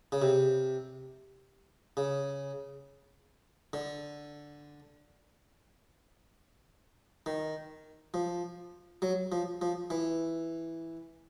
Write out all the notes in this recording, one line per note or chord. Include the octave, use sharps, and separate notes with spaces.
C#3
C3
C#3
D3
D#3
F3
F#3
F3
F3
E3